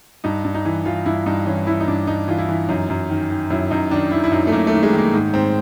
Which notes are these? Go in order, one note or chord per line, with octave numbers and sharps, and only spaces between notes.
G2 D#4
G2
D#4
E3
E3 F4
G2 E4
G2 D#4
E3 C#4
E3 E4
D#4
G2 D4
G2 D#4
E3 F4
E4
E3
F#2 D#4
F#2
D#3
D#3
F#2 E4
F#2 D#4
D#3 D4
D#3 E4
E4
F#2 D#4
A3
F#2 A#3
A3
D#3
G#3
D#3 A#3
G#2
G#2 C4